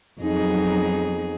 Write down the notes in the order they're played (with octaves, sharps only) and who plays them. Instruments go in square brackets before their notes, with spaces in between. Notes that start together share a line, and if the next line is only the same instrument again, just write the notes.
[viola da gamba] F2 G#4 [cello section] F#3 B3 D#4